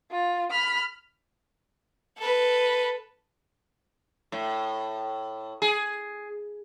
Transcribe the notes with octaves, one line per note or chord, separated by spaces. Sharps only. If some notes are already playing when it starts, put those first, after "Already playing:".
F4
B5 F6
A4 B4
A2
G#4